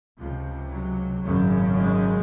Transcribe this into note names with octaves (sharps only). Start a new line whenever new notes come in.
C#2 C3 F3
F#3
G#1 F#2 C#3
G#3